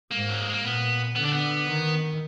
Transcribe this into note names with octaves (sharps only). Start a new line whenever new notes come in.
G#2 A#3
F#3
G#3
A#3
A#2 B3
D3 B3
D4
B3
D#3